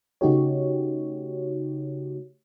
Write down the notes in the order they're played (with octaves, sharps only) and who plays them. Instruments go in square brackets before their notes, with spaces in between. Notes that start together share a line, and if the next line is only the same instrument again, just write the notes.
[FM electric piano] C#3 A3 D#4 F#4 G4 C#5